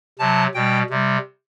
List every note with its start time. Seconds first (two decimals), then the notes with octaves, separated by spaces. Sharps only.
0.19 C3 F#3 A5
0.54 B2 G3 G5
0.90 C3 G3